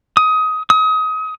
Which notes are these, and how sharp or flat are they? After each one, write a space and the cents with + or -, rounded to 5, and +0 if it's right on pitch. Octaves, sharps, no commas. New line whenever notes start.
D#6 +20
D#6 +30